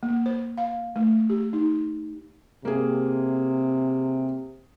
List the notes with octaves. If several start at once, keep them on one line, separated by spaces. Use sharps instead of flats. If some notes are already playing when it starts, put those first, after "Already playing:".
A#3
C5
F5
A3
G4
D#4
C3 A#3 G#4